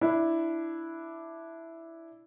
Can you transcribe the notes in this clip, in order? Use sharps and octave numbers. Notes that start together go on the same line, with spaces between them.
D4 E4